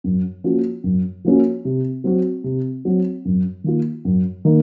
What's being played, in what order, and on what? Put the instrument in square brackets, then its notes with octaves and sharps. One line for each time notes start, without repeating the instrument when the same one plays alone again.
[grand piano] F#2
F3 A#3 C#4 F#4
F#2
F3 A#3 C#4 F#4
C3
F#3 C4 F#4
C3
F#3 C4 F#4
F#2
D#3 A#3 F4
F#2
D#3 A#3